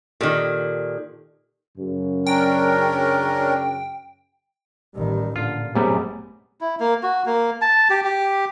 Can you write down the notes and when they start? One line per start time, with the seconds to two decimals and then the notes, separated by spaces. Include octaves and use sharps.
0.21 A#2 D#3 G4 A4 D5
1.77 F#2 C#3
2.27 C#4 D4 A#4 G5
4.95 A1 D#3 G3
5.36 A#2 D3 F4
5.75 F#2 C3 G3 A3 B3 G#4
6.61 E4
6.80 A#3
7.03 F#4
7.26 A#3
7.62 A5
7.90 G4
8.04 G4